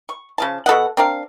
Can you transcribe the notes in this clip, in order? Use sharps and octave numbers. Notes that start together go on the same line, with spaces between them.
C#6
C#3 F3 A5
B2 A4 D#5 F#5
C4 D4 A#4 F5